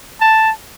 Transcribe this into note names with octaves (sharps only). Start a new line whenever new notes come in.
A5